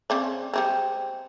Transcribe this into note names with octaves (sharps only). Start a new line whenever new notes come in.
C#3 C4 D5
G3 G#3 C4